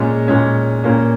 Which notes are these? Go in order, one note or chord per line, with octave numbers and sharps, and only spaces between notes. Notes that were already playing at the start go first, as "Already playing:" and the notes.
Already playing: A#2 G#3 C#4
A#2 G#3 C#4
A#2 A#3 C#4